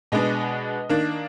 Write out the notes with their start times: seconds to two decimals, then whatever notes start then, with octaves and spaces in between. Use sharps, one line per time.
0.12 B2 G#3 B3 D4 D#5
0.89 D#3 A#3 D4